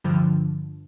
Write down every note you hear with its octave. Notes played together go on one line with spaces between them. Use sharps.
G2 D3 F3